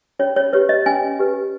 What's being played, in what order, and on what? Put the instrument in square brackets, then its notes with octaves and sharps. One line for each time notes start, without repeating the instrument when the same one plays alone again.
[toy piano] C#4 C#5
C#5
G4 B4 C#5
D#5
C#4 G#5
G4 B4